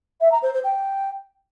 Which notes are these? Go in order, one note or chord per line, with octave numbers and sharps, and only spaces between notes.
E5
A#5
C5
C5
G5